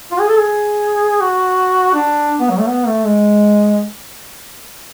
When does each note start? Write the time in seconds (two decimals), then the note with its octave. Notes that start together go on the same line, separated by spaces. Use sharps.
0.11 F4
0.20 G#4
0.29 A4
0.38 G#4
1.21 F#4
1.94 D4
2.40 B3
2.50 F#3
2.59 A3
2.68 B3
2.86 A3
3.04 G#3